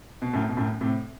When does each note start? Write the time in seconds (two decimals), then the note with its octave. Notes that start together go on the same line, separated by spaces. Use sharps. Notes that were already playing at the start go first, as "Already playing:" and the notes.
0.22 B2
0.33 F#2 A2
0.49 B2
0.57 F#2 A2
0.81 A2 C3